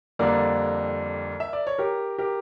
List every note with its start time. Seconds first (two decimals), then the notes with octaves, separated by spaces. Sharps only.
0.19 F2 D3 G3 A#3 A#4 D5
1.40 E5
1.53 D5
1.67 C#5
1.78 G4 A#4
2.18 G4 A#4